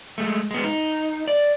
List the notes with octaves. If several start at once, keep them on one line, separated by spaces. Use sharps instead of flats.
G#3 A3
G#3 B3
D#4
D5